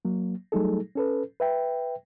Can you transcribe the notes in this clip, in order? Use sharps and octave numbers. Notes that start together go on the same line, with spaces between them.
F#3 A#3
F#3 G3 A3 D#4 G#4 A4
C#4 A4 B4
B4 E5 G5